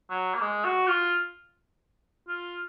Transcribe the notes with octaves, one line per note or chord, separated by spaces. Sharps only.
F#3
A#3
G#3
F#4
F4
F4